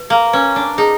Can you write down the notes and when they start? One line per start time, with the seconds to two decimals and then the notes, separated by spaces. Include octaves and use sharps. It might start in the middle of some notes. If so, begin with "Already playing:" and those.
Already playing: B4
0.10 A#3
0.33 C#4 B4
0.56 D4
0.78 D#4 G#4